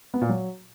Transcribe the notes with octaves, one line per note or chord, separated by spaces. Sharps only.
B3
A#2
F#3